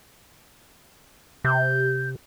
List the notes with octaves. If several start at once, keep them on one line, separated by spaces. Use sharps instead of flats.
C3 G6